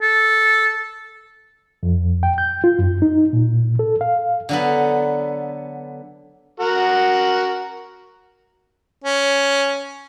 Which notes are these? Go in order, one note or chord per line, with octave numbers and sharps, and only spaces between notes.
A4
F2
G5
G6
F4
F#2
D#4
A#2
A4
F5
D3 F#3 B3
F#4 A#4 F#5
C#4